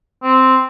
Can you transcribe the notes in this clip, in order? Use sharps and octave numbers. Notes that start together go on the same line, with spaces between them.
C4